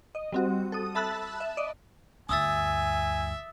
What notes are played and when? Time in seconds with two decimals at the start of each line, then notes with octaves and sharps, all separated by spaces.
0.15 D#5
0.32 G3 C4 F#4
0.72 A4 D#6
0.95 E5 A5 B5 E6 F#6 A6
1.40 E5
1.57 D5 D#5
2.29 D2 G2 E5 G#5 D#6 E6 A6